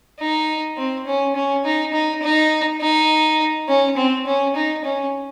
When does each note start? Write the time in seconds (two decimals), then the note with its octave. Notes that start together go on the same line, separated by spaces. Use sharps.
0.19 D#4
0.77 C4
1.07 C#4
1.36 C#4
1.65 D#4
1.94 D#4
2.23 D#4
2.81 D#4
3.69 C#4
3.97 C4
4.27 C#4
4.56 D#4
4.85 C#4